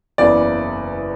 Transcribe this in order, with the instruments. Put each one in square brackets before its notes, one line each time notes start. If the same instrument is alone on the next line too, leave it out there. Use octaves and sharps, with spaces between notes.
[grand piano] F#1 E2 C#3 D5